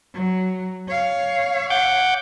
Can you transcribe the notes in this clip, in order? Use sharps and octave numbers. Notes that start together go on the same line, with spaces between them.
F#3
C#5 F5
F#5 D6 G6